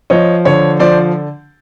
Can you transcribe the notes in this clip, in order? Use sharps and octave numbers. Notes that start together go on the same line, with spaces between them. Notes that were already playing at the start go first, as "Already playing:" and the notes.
F3 C#5 D#5
D3 C#5
F3 C5 D5